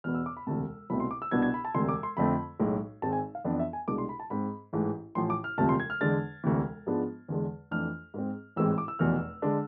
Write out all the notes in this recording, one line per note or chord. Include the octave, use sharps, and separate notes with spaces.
E2 B2 B3 F6
E6
D6
B5
E1 D2 C3 A5
C2 B2 A3 C4 B5
C6
D6
E6
C2 B2 B3 D4 G#6
G#6
B5
A5
E1 D2 C3 C6
D6
C6
F2 D3 A3 C4 B5
B1 A2 G#3
G#1 G#2 G#3 C4 A5
G#5
F5
F2 E3 B3 D4 D5
E5
G#5
C2 B2 G#3 D4 D6
C6
B5
A5
G#2 G#3 C4 B5
A1 G#2 E3 A3
A1 A2 F3 C6
D6
F6
E1 D2 C3 F3 A3 A5
C6
G#6
F6
E2 D3 G#3 D4 A6
E1 D2 C3 E3
G#2 F3 G#3 B3 D4
E2 D3 G#3
F2 E3 A3 D4 F6
G#2 G#3 C4
A1 G#2 E3 G#3 C4 E6
D6
E6
F1 E2 B2 F6
D3 G#3 D4